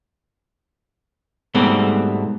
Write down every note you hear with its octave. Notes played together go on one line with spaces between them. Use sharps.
G#2 B2 G3 A3 C4